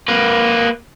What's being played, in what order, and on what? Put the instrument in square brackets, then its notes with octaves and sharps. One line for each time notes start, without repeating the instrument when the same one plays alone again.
[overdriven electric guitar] A#3 B4